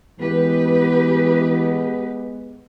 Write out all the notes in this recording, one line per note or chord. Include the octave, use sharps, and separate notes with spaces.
E3 G#3 B3 G4 B4